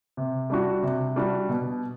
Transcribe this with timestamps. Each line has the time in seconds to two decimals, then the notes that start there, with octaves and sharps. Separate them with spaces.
0.17 C3
0.50 G3 D4 F#4
0.83 C3
1.16 G3 D4 F#4
1.49 B2